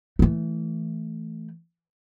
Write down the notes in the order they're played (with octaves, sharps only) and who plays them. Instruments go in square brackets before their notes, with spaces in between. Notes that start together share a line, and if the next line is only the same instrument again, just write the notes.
[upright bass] E3 A3